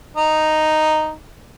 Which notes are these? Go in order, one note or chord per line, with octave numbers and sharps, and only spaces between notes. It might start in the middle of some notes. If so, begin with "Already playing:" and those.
D#4